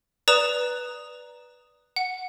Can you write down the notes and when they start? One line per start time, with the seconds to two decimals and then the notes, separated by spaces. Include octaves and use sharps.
0.28 B4 D5 A#5 D#6 E7
1.96 F#5